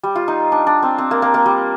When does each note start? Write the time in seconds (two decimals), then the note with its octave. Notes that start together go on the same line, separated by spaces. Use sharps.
0.03 G3
0.16 F4
0.28 D#4
0.52 D4
0.67 D4
0.83 C4
0.98 C4
1.11 A#3
1.22 A#3
1.34 A#3
1.46 G3